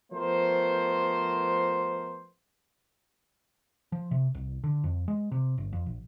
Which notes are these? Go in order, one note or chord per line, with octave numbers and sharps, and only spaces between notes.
F3 A3 B3 A#4 C5
F3
C3
C2
D3
F2
G#3
C3
G1
F2
A#1